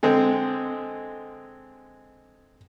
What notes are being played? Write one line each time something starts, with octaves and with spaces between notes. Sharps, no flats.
D3 G#3 C4